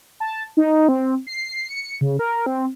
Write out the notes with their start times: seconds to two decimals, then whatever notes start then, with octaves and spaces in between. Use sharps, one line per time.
0.20 A5
0.57 D#4
0.89 C4
1.27 C7
1.69 C#7
2.01 C#3
2.19 A#4
2.46 C4